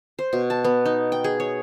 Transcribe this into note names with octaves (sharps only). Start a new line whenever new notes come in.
C5
B2
A5
B3
D#4
G5
G#4
C#5